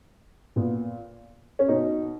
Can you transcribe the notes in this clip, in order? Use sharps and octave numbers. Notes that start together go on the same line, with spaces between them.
A#2 B3
C#4
B2 D#4